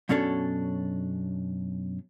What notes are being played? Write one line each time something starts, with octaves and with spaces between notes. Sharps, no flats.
F#2 B2 C#4 D4 A4 C#5